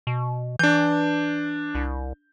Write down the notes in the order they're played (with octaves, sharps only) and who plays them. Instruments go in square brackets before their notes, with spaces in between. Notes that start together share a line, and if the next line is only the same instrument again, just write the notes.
[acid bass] B2
[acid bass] E3 [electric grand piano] D4 G6
[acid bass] C2